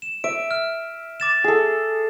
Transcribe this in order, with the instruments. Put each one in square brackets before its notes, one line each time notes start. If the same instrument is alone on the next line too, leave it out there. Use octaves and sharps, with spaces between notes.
[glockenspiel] E7
[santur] E5 [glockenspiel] D7
[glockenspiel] F6
D6 A6 E7
[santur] G#4 A4